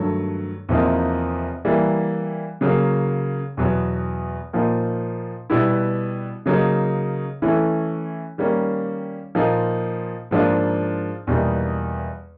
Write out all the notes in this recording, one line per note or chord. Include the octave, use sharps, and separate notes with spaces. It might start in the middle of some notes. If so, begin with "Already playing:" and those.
Already playing: G2 D#3 F#3 A3
E2 C3 F3 A#3 D#4
E3 G3 A#3
C#3 F#3 A#3
E2 B2 F#3 B3
A#2 F3 A#3 D#4
B2 G3 B3 E4
C#3 F#3 A#3 D#4
E3 A3 C#4 E4
D#3 G3 A#3 C#4
A#2 F3 A#3 D#4
G#2 F3 A#3 D4 F4
E2 B2 G3 A#3 D#4